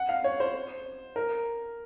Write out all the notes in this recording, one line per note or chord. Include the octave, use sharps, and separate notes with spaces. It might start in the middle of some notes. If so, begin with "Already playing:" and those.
Already playing: F#5
F5
C#5
C5
A#4